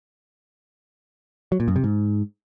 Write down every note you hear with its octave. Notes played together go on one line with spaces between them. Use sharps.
F#3
A#2
F#2
C3
G#2